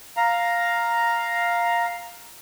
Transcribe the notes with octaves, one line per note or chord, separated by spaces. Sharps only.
F5 A#5